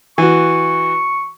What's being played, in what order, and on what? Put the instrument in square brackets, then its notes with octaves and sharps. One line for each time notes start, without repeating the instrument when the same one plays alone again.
[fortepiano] E3 F#4 [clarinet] C#6